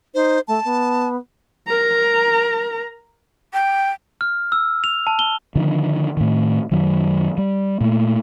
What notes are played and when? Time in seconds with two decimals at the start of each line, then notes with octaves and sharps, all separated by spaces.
0.15 D#4 C5
0.48 A3 A5
0.64 B3
1.67 A#4 A#5
3.53 G5
4.21 F6
4.52 E6
4.84 F7
5.07 A5
5.19 G7
5.56 D3 D#3 F3
6.17 A2 D#3
6.71 F#2 D#3 F#3
7.38 G3
7.81 A#2 A3